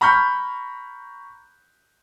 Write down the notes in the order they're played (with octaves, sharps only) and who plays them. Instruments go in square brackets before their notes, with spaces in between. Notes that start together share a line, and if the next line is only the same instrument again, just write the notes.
[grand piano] A#5 B5 C#6 F6 G6